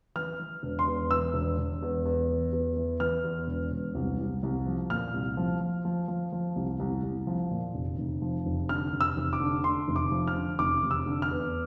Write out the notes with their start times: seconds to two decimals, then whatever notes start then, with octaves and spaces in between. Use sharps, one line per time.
0.16 E3 F6
0.39 E3
0.63 E1
0.79 C6
0.87 E2
1.11 E3 E6
1.34 E1
1.58 E1
1.82 E2
2.05 E2
2.29 E3
2.53 E2
2.77 E3
3.00 E3 F6
3.24 E2
3.47 E1
3.71 E1
3.95 C2
4.19 C2
4.43 C2
4.66 F3
4.90 A#2 F6
5.14 C2
5.37 F3
5.61 F3
5.85 F3
6.08 F3
6.32 F3
6.56 C2
6.79 C2
7.03 C2
7.27 F3
7.51 A#2
7.74 F1
7.98 F1
8.22 F3
8.46 F1
8.69 D3 F6
8.93 F1
9.01 E6
9.17 F1
9.33 D6
9.40 D3
9.64 D3 C6
9.88 F1
9.96 D6
10.11 F3
10.27 F6
10.36 D3
10.59 F1 D6
10.83 F1
10.91 E6
11.06 D3
11.22 F6
11.30 E2